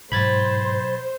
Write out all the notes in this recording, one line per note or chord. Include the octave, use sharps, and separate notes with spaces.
G#2 B2 F#3 C5 B5 G#6 A6